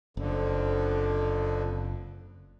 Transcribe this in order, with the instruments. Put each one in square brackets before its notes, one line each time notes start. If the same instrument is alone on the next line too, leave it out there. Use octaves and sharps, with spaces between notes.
[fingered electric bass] F#1 [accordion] F2 D3